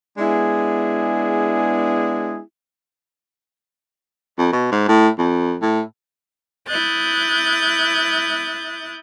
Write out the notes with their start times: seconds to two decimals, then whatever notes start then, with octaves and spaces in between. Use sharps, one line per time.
0.18 G#3 B3 D4 E4 G#4
4.38 F2
4.53 B2
4.71 G#2
4.88 A2
5.18 F2
5.62 A2
6.69 E4 D#6 F#6 G6 A6